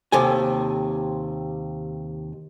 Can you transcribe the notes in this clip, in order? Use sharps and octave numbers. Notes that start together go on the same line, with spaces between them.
D#2 C3 A4 G#5